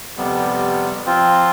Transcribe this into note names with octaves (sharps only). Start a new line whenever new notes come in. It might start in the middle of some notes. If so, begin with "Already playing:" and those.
F2 C3 G3 B3
F3 C4 F4